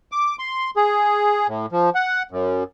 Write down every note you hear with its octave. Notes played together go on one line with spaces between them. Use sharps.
D6
C6
G#4
A2
F3
F#5
F#2